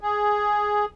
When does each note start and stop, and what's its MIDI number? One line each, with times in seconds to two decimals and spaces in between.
0.01 0.85 68